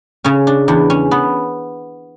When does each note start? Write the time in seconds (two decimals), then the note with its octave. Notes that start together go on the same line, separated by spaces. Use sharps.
0.24 C#3 C#4
0.47 D4
0.68 E2 D4
0.90 C#4
1.11 B3